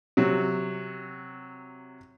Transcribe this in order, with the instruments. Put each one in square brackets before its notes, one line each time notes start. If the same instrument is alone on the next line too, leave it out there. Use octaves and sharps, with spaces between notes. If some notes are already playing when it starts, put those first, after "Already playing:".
[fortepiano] C3 F#3